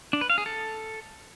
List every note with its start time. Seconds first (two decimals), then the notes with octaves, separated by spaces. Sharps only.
0.13 D4
0.21 B4
0.30 F5
0.38 G#4
0.46 A4